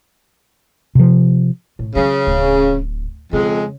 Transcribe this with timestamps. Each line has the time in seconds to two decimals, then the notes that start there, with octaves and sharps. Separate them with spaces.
0.95 C3 F3
1.79 A2
1.96 C#3 F#3
2.27 D1
3.33 F2 C#3 G#3